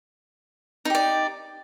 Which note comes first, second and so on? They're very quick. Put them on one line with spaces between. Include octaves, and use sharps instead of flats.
D#4 G4 D5